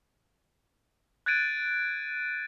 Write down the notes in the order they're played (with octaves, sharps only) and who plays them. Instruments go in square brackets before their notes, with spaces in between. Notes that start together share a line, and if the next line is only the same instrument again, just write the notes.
[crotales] F#6 G#6 A6 D7 D#7